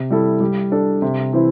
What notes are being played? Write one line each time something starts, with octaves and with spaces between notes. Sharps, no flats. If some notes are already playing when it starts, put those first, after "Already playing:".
Already playing: C3
G3 E4 A4
G3
D4 A4 D5
C3
E3 C4 E4